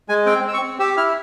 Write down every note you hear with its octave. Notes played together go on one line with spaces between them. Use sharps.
G#3 G#5
C4 G5
C4 E6
C#6
C4
G4 E6
E4 F6